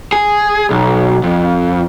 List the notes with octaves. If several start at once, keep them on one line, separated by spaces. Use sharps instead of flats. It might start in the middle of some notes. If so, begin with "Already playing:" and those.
G#4
B1
F2